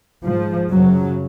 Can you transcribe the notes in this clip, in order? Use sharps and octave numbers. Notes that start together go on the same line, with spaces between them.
G#2 F3
F#2 C#3 F#3